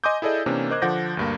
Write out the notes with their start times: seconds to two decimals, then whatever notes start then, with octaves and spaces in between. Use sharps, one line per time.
0.04 D#5 G#5 C6 D6 D#6 G6
0.22 E4 G#4 A4 D5 D#5
0.46 C3 E3 A#3 C#4 D4
0.70 A#4 C5 D#5 D6 F#6 G#6
0.82 D3 F3 F#5 D6 G6 A#6
1.17 D2 G2 A#3